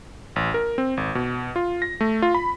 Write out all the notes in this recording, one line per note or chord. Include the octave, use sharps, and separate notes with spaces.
A1
A#4
C4
G#1
B2
F4
A#6
A3
F4
B5